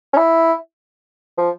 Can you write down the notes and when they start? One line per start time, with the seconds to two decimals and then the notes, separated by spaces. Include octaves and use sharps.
0.13 C#4
0.17 E4
1.38 F3